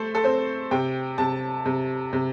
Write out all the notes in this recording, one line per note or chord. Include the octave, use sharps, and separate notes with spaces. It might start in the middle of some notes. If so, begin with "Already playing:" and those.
Already playing: A3 A4 C5
A4
C4 C5
C3 G5
C3 A5
C3
C3